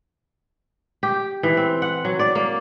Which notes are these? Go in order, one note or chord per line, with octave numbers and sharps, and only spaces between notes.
G4
E3
C4
F#5
F#3
D5
A#3